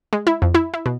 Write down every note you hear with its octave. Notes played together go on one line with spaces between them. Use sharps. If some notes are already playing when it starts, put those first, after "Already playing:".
G#3
E4
F2
E4
E4
B2